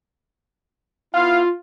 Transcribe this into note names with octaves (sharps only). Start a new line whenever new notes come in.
B3 E4 F4 F5